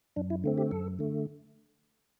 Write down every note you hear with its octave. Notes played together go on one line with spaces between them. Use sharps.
F#2 D4
E4
D3 A3 C4
G4
F#2 A4
D3 A3